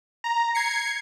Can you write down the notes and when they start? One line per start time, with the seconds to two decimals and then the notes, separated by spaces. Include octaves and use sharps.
0.24 A#5
0.55 G#6 C7 C#7